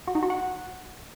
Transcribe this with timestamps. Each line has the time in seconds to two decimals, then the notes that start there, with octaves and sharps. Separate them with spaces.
0.07 F#4
0.15 D#4
0.23 F#4
0.30 F#5